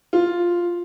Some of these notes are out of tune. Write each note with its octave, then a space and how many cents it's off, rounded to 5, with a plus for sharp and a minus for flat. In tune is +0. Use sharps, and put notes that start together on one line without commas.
F4 +0